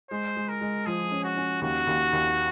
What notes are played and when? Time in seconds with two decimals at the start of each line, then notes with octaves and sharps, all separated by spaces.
0.10 G#3 C5
0.37 G#3
0.49 A#4
0.61 G#3
0.86 F3 G#4
1.12 C#4
1.24 F#4
1.37 C#4
1.62 D#2 F#4
1.87 D#2
2.13 D#2